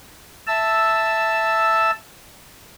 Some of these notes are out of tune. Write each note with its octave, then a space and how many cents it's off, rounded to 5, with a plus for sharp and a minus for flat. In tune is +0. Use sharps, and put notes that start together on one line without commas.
E5 +0 A5 +0 E6 +0